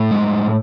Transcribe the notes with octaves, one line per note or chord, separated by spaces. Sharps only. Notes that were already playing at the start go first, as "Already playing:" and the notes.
Already playing: A2
G#3